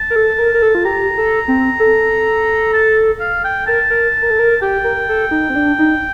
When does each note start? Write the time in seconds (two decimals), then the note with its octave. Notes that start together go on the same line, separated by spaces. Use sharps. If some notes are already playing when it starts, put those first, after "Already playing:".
Already playing: A5
0.10 A#4
0.16 A4
0.38 A#4
0.54 A#4
0.62 A4
0.75 F4
0.85 G4 A#5
1.18 A4
1.48 C4
1.80 A4
2.73 A5
3.20 F5
3.44 G5
3.67 A#4 A5
3.90 A#4
4.22 A#4
4.30 A4
4.39 A#4
4.62 G4 G5
4.84 A#4
5.09 A4
5.31 D#4
5.50 C4
5.55 D4
5.79 D#4